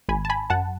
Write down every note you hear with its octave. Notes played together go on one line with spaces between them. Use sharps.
G#1 G#5 B5
A5
G#5 B5
F#2 F#5 A5